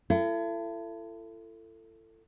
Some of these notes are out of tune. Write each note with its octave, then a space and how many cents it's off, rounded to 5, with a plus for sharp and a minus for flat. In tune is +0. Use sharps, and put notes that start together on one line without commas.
E4 +40 A4 +20